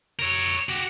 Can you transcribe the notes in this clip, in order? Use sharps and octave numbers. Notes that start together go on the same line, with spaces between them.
A#4 C#5
F#4 G4